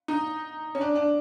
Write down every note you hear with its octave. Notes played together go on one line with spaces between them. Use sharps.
D#4
C#4
D4
D4